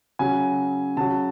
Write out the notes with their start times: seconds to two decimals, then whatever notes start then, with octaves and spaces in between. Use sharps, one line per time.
0.19 C#3 F#3 G#5
0.97 C#3 F#3 A5